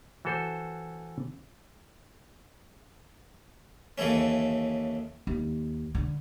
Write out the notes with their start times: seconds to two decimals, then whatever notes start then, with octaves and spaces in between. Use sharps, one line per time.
0.25 E3 F#4 A4 C5
3.98 D#2 C#3 E3 A3 C#4
5.27 D#2
5.95 D3